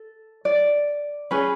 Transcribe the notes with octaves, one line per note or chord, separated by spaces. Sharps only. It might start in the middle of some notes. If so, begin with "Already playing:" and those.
Already playing: A4
D5
C#4 G#4 B4